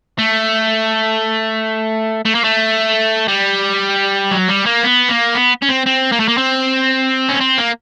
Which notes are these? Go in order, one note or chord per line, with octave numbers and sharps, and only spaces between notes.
A3
A3
A#3
A3
G3
F#3
G3
A#3
B3
A#3
B3
C#4
C4
C4
A#3
A3
A#3
C4
C#4
C4
A#3